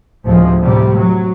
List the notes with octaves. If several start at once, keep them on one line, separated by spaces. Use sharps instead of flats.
D2 A2 C3 F3 G#3
A2 C3 G3
F#3